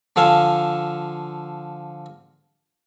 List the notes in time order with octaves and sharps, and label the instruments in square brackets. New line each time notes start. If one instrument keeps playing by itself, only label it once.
[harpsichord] D3 F3 A4 F5 G#5 A5